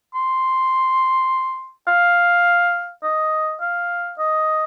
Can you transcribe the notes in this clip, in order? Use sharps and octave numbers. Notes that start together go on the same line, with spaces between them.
C6
F5
D#5
F5
D#5